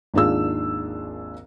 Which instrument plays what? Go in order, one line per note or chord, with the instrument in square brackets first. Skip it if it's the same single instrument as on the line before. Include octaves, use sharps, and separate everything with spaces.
[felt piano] G#1 D#2 D4 F4 G#4 E6